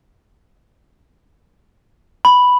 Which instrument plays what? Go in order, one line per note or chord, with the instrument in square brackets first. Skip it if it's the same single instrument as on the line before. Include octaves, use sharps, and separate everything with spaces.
[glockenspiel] B5